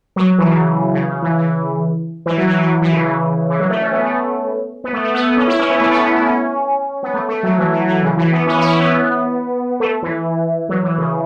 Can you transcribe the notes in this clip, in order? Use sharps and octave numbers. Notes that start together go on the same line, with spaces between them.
F#3
F#3
E3
C#3
C#3
C#3
E3
E3
E3
F#3
E3
E3
E3
C#3
E3
E3
F#3
A3
C#4
B3
A3
B3
A3
A3
B3
C#4
E4
C#4
B3
A3
B3
C#4
E4
C#4
B3
A3
A3
F#3
E3
E3
E3
C#3
E3
B3
C#4
E4
C#4
B3
A3
E3
F#3
E3
C#3